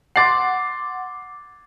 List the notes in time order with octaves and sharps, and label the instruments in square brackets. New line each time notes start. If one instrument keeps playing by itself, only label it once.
[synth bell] F#5 D6 [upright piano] C6 A6 C7